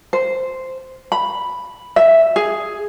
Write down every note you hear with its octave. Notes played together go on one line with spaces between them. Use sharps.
C5
B5
E5
G#4